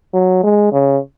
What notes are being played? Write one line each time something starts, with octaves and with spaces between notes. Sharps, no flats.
F#3
G#3
C#3